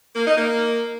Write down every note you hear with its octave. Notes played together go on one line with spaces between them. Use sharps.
A#3
D#4
A#3